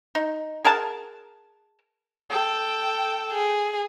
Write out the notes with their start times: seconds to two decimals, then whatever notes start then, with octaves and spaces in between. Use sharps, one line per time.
0.15 D#4
0.65 G#4 A#4 F#5 A5
2.30 A4 G5
3.32 G#4